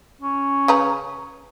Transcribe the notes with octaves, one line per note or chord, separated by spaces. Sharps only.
C#4
C#3 B4 A#5